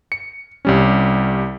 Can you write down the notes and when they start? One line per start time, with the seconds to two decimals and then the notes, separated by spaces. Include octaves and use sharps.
0.12 C#7
0.65 C2 G3 C#4